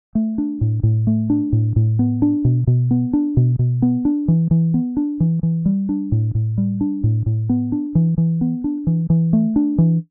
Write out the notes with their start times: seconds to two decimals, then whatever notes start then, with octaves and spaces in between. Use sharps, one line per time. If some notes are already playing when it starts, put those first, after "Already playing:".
0.15 A3
0.38 D4
0.61 A2
0.83 A2
1.07 A3
1.30 D4
1.53 A2
1.76 A2
1.99 B3
2.22 D4
2.45 B2
2.67 B2
2.91 B3
3.13 D4
3.37 B2
3.59 B2
3.82 B3
4.05 D4
4.28 E3
4.51 E3
4.74 B3
4.97 D4
5.20 E3
5.43 E3
5.66 G3
5.89 D4
6.12 A2
6.35 A2
6.58 G3
6.81 D4
7.04 A2
7.26 A2
7.49 B3
7.72 D4
7.95 E3
8.18 E3
8.41 B3
8.64 D4
8.87 E3
9.10 E3
9.33 A3
9.56 D4
9.78 E3